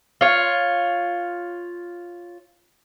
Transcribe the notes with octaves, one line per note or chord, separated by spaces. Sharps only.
F4 C#5